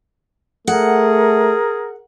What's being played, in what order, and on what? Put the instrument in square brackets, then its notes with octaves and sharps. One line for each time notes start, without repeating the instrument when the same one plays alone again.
[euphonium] A3 [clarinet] G#4 [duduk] A#4 [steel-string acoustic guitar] F#5